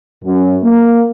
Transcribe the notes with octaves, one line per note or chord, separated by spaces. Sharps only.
F#2
A#3